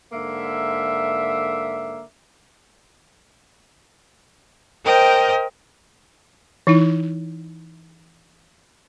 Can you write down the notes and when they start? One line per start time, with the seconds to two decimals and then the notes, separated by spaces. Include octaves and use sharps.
0.13 G#2 D3 A#3 E5
4.84 A#4 C5 D#5 G5
6.67 E3 D#4 E4